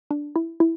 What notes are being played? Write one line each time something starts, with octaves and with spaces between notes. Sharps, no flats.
D4
E4
E4